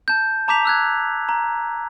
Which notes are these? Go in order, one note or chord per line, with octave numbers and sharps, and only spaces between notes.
A5 G6
A5 A#5 D6 G6 B6 F7
E6 F#6 G#6
A#5